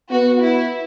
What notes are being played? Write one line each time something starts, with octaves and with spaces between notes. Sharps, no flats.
B3 F#4
E4